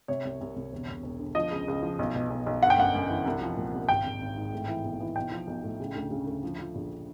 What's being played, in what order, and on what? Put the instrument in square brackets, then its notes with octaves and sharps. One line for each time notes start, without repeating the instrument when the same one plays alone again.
[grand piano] C3 C#5
C2
C2
C2
E1
E1
E1
D3
F3 D#5
C#2
C#2
F3
B1
B2
B1
B1
G1 F#5
G5
F#2 F#5
F#2
E3
C2
F3
A#2
C2
G#1 G5
G#1
G#1
G#2
A2
E3
B1
E3
B1 G5
F3
B1
A2
C#3
D2
C#3
D2
F3
F3
A#1